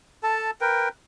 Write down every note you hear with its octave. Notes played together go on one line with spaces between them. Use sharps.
A4 A5
A#4 B4 G5